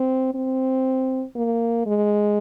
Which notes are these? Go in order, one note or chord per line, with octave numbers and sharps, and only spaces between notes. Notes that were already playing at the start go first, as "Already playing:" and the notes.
Already playing: C4
C4
A#3
G#3